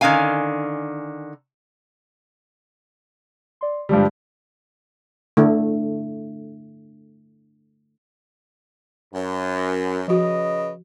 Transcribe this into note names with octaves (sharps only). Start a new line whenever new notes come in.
D3 D#3 C#4 F5 G#5
D5 C6
G2 D3 F3 G3 G#3
D3 A3
F#2
C#3 F3 F#4 B4 D#5